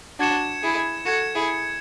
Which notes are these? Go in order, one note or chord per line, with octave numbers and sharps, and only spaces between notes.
D4 F#4 G#6 C#7 E7
E4 G#4
F#4 A4 G#6 C#7 E7
E4 G#4